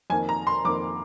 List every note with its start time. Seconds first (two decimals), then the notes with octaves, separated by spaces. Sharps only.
0.10 F2 D#3 A#3 G#5
0.29 A#5
0.47 C6
0.65 F2 D#3 A#3 D6